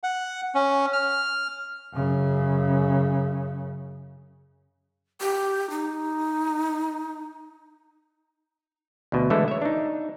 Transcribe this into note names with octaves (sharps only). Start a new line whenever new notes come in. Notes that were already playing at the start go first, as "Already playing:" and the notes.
F#5
C#4
F6
F#2 C#3
G4
D#4
D2 B2
D3 E3 G#3 A3 E4 A4
C#5 E5
D4 D#4